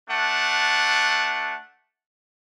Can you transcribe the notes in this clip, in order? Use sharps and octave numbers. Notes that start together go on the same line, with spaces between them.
A3 D4 F#5